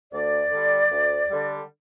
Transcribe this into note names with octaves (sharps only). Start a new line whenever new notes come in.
D2 D5
D3 G3
D2
D3 G3